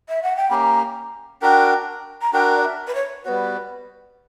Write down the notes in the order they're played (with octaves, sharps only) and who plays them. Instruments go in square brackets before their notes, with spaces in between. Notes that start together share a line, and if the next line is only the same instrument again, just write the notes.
[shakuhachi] E5
F#5
G5
[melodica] A#3 C#4 G4 [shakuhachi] A#5 B5
[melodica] D4 F#4 A#4 [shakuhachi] G5
[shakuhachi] A#5
[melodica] D4 F#4 A#4 [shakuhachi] G5
[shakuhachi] D5
E5
B4
C#5
[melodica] G3 B3 F#4 [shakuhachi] B4 C#5